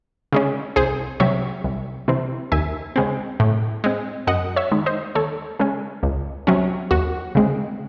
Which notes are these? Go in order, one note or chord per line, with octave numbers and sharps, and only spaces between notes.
C#3 G#3 C#4
C2 G#4 C5
C3 F#3 C4 C#5 E5
C2
C3 E3 C4
D#2 E5 G#5
C#3 G#3 C4
A2
G#3 C4
F#2 D#5 F#5
C#5 E5
D#3 G#3
C5 D#5
D#2 A4 C#5
C#3 G#3 C#4
C#2
C3 F#3 C#4
D#2 F#4
C#3 G#3 C4